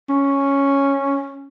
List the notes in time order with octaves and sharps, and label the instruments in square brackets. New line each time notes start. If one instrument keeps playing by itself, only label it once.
[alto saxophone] C#4